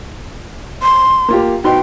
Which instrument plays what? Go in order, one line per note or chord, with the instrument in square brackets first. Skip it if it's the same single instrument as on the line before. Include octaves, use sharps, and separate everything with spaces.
[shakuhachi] C6
[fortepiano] A#3 F4 G4
[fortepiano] B2 D#4 C6 [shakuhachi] G5